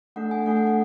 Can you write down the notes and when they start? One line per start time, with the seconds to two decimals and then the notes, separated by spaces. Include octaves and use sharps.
0.16 A3 D4 A4 F#5
0.31 G#5
0.46 A3 D4 A4 F#5
0.57 G#5
0.67 F#5